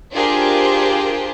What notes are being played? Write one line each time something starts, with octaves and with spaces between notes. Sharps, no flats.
D4 F4 G4 G#4 A#4 C5